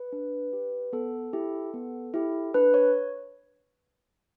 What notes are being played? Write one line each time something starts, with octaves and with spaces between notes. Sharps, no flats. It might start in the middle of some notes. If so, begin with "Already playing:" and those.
Already playing: B4
D4
G4
B3 A4
E4 G4
B3
E4 G4
D4 B4
C#5